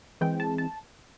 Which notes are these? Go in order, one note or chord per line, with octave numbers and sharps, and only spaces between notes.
E3 G#3 C4 G5
A5
A5